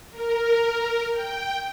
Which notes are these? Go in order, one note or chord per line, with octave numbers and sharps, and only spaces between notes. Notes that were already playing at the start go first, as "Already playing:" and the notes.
A#4
G5